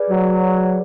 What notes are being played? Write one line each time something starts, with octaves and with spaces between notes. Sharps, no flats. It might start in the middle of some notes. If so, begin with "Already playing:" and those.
Already playing: G#4 B4 D5
F#3